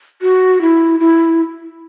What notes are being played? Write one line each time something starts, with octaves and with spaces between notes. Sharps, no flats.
F#4
E4
E4